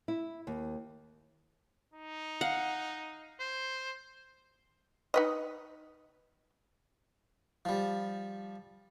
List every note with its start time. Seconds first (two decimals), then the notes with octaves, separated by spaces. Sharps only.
0.08 E4
0.47 D#2
1.94 D#4
2.41 F5 F#5
3.40 C5
5.14 D#4 B4 D#5
7.65 F3 G3